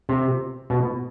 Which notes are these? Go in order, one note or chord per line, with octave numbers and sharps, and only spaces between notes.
C3
B2